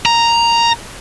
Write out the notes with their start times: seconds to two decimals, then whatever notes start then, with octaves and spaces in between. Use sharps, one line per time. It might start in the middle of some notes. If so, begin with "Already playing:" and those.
0.06 A#5